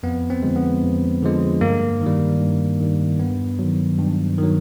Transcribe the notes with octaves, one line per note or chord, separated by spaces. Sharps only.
F2 B3
C4
D3 F3 G#3
B3
F2
D3 F3 G#3
G2 A#3
D#3 G3
G2
D#3 G3
G2 B3
D#3 F#3
G2
D#3
F#3